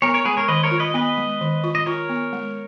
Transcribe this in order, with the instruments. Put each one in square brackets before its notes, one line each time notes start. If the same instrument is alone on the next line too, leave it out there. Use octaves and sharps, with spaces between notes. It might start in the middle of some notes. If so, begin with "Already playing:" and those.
[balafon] B3 [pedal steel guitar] A#4 C#5
[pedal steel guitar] A#4 C#5
[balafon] G#3 [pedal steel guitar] G#4 B4
[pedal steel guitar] A#4 C#5
[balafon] D#3 [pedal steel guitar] B4 D#5
[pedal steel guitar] A#4 C#5
[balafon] F4
[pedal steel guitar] B4 D#5
[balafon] B3 [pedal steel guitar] B4 D#5
[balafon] G#3
D#3
F4
[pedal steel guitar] D#5
[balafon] F4 [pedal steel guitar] A#4 C#5
[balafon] B3
G#3